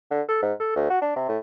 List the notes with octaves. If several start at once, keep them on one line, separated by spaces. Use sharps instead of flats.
D3
A4
G#2
A4
D2
F#4
D4
C3
A2